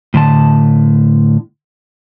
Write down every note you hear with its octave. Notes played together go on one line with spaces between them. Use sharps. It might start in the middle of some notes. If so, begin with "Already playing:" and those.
A2 D3 A5